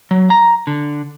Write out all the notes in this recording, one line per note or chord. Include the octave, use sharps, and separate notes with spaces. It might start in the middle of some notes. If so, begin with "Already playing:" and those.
F#3
A#5
D3